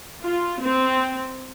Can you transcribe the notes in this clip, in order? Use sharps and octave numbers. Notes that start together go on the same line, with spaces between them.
F4
C4